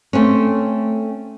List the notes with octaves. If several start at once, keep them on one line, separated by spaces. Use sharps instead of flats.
A3 C4 C#4